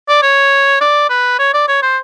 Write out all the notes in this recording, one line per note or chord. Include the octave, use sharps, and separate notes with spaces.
D5
C#5
D5
B4
C#5
D5
C#5
C5